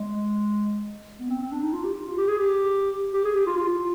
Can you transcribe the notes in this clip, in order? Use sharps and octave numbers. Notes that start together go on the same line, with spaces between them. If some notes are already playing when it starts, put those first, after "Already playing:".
Already playing: G#3
B3
C4
C4
D4
D#4
F4
G4
F4
F4
G4
G#4
G4
G4
G#4
G4
F4
F4
F4